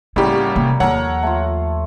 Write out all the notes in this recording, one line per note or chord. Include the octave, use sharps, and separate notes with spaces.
A2 C#3 G3 A#3 E4 F#4 G4
C#5
C3 A#3
D#2 F3 A4 A#4 C#5 F#5
A3 F4